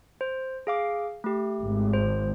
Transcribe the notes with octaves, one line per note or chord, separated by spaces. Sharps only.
C5
G#4 F5 D6
A3 G4
G#1
C5